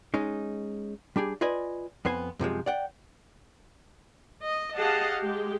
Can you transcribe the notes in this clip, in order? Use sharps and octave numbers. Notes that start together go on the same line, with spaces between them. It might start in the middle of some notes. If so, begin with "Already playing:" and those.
G#3 C#4 D#4
G3 D4 G4 G#4
F4 B4 D5 D#5 G#5
F2 B3 C5 G#5
F#2 C3 F3 G#3
D5 F#5 G5
D#5
G4 G#4 D#5 F5 F#5 A5
G#3 G4